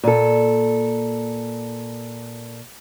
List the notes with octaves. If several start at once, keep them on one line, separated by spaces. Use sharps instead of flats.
A#2 A4